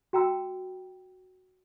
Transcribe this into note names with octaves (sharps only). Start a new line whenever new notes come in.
F#4 G5 A#5 E6